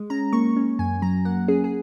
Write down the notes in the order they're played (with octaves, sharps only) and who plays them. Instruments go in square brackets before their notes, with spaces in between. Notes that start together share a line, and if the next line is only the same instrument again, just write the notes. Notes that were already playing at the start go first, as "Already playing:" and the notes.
Already playing: [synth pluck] G#3
C#4 A#5
A#3 C#6
C#4
F#2 G#5
F#3 A#5
A#3 F#5
C#4 G#4
G#4